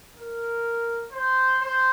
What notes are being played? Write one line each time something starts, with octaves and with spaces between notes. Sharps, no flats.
A#4
C5
C5